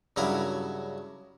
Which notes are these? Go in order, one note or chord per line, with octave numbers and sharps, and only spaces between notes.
G2 C#3 F#3 E4 A#4 D#6